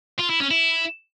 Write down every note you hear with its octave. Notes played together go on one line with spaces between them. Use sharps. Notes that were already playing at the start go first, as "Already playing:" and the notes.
F4
E4
C#4
E4